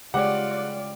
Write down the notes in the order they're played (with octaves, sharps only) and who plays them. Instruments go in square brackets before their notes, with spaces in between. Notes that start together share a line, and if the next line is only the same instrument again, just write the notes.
[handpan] C#3 G#3 C#5 [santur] G3 [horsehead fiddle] F4 D5 [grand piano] F#5